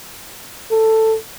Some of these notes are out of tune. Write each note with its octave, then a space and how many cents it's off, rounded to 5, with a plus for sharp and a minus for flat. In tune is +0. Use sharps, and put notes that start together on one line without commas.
A4 +10